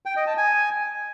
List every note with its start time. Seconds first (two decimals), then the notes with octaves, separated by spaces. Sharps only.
0.06 G5
0.16 D#5
0.27 A5
0.37 G#5